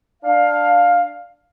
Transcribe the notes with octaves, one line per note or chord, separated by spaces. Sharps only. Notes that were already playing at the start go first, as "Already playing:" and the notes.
D4 F5